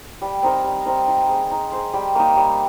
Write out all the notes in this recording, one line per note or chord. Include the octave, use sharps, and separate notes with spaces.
G3
C4 D#4 A#4
G3
C4 D#4 A#4
D#4
G#4 C5
D#4
G#4 C5
G3
A#3 D#4
G3